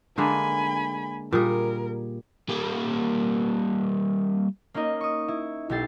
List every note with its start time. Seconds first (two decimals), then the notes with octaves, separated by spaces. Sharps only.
0.18 D3 G#3 A#3 G#5 B5
1.33 A#2 G3 G#4 A#4
2.49 G3 A#3
4.74 A#3 C#4 D#4 A#4 D#5
5.01 C#6 D#6
5.28 E4
5.70 B1 E4 G4 A6 C7